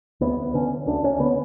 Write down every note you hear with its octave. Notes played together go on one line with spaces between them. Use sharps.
D2 B3
D3 C#4
D2 D4
C#4
D3 B3